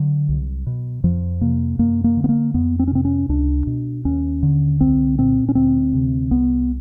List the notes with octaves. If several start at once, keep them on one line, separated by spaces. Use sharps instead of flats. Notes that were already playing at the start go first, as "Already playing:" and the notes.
Already playing: D3 F#3
C2
B2
F2 F3
C3 A#3
F#2 A#3
A#3
D3
B3
A#3
F2 B3
C4
C#4
C3 C4
C#4
C#2 D4
B2
D#2 C#4
D3
C2 C4
A#2 C4
C#4
D2 C4
C3
C2 B3